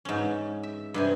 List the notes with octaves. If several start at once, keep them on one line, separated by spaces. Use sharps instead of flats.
G#2 C#4
E5
G2 C3 G#5